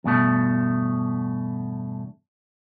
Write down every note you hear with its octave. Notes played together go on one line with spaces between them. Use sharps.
E2 G2 B2 A3